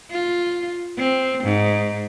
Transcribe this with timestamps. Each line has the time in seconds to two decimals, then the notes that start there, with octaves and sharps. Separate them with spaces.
0.11 F4
0.98 C4
1.44 G#2